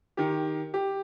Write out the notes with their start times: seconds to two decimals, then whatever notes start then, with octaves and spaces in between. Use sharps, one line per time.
0.17 D#3 G4
0.74 G4